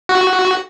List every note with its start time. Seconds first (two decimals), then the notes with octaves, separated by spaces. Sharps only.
0.09 F#4